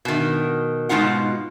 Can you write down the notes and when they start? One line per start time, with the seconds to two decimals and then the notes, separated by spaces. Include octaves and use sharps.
0.05 B2 D#3
0.89 G#2 B2 G#3 D#4 F4 F#5